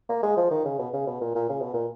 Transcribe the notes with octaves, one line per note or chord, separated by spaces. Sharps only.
A#3
G#3
F3
D#3
C#3
B2
C#3
B2
A#2
A#2
C#3
B2
A#2